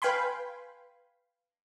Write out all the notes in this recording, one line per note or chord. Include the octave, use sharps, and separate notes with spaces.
B4 F5 G5 G#5 B5 C6